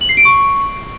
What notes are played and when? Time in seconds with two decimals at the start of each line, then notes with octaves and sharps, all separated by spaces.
0.01 F#7
0.09 C7
0.17 D7
0.25 C#6